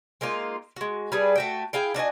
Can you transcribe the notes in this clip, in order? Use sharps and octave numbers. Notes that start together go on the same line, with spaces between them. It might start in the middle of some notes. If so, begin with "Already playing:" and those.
G#3 A#3 D#4 F4
G#3 F#4
G3 D4 G#4 B4
A3 F#4 G5
E4 G#4 F5 G5
D4 F#4 D#5 G#5